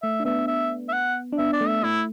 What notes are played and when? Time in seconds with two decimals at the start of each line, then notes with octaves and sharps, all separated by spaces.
0.03 A3 E5
0.20 D4
0.25 B3 E5
0.48 E5
0.89 E5
0.93 F#5
1.32 D4
1.38 B3 E5
1.53 D5
1.61 A3
1.68 E5
1.83 A3 E4